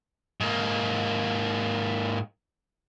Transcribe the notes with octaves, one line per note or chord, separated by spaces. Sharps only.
G#2 A#3